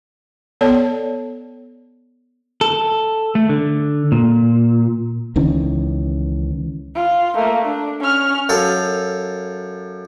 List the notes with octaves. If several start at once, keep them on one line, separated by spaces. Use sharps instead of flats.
B3 A4 C#5 D5 A5
A4
A3
D3
A#2
C#2 D#3 E3 C#4
F4
A3 A#3
D4
C#4 F6
F#2 A4 F5